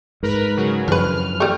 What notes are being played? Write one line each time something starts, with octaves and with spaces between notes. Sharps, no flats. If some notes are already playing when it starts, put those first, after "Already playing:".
G#2 A#4 B4 B5
C#3 F#3
F#2 E3 F3 D4 B4 F6
G3 A3